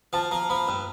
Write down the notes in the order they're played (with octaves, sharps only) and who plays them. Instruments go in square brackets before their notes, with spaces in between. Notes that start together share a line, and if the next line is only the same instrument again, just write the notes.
[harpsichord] F3 [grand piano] A5
[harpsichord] F3 [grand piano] A#5
[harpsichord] F3 [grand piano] B5
[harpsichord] G2